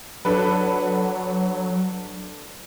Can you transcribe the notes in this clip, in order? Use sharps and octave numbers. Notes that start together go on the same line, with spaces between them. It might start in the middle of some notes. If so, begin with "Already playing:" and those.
F#3 D4 A4 B4